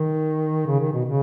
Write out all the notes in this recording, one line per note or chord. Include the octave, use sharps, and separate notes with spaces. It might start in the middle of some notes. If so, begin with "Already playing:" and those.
Already playing: D#3
C#3
D#3
B2
C#3